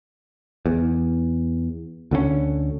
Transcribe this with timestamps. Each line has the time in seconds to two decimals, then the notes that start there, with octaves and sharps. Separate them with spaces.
0.66 E2
2.11 D2 D3 E3 C#4